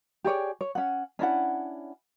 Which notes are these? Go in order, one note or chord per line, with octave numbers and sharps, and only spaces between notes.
G4 G#4 C#5 D5
C#5
C#4 F#5
C#4 D4 E4 F#5